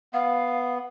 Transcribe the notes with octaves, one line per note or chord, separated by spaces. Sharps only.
B3 F5